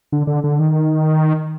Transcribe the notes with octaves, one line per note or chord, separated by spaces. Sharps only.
D3
D3
D3
D#3